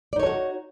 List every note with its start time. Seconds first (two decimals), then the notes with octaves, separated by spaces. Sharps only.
0.13 D5
0.16 D#4
0.19 C#5
0.23 A4
0.26 F#4